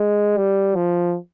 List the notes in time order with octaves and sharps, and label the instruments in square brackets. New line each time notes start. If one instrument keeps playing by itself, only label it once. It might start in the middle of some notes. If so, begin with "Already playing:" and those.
Already playing: [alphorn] G#3
G3
F3